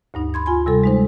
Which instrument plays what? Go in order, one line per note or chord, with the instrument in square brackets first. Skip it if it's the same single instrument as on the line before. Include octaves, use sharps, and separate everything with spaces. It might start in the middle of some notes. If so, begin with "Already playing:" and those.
[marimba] D2 G2 D#4
B5 C6 G#6
F4 G#5 C6
C3 G3 A4
G#3 D#4 C5